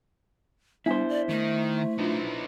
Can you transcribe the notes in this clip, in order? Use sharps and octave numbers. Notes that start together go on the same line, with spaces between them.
G3 B3 D4 E4 C5 G#5
D5
D#3 A3
B3 D4 D#4 F4